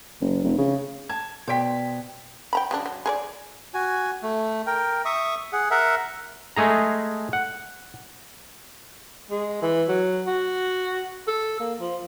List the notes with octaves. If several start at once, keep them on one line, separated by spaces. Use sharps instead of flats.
F#1
F1
C#3
A5 G#6
B2 C5 D5 G5 B6
G5 A#5 B5
C#3 F#3 D4
F#3
G#4 A#4 D5
F#4 G#5
A3
A#4 G5
E5 C#6 D#6
G#4 F#5
A#4 E5 F#5
G#3 A3 G#4 A#5
F#5
G#3
E3
F#3
F#4
A4
A#3
F3